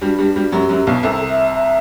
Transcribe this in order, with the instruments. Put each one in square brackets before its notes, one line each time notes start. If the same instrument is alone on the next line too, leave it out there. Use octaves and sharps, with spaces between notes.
[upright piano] G2 G3 [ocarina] F#4
[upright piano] G2 G3 [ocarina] G4
[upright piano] G2 G3 [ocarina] F#4
[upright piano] F#2 F#3 [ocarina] G4
[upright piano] F#2 F#3
B1 B2
[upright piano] C2 C3 [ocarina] A4
[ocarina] E5
E5